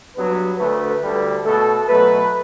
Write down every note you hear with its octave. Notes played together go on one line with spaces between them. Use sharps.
G2 F#3 B3 B4
D2 D3 A3
D2 D3 G3
B2 A3 A4
B2 F#3 A3 B4